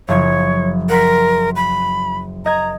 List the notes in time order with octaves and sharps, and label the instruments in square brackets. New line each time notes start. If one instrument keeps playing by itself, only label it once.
[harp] F#1 F3 G#6 [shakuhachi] C#5
[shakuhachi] A#4 [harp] F#5 C6 B6
[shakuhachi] B5
[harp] D#5 G#6 [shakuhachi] A#5